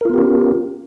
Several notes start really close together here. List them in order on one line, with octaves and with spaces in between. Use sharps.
A#4 F4 B3 G4 C#4